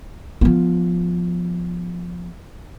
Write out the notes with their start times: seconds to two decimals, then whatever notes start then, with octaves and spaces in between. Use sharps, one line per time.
0.41 F3 B3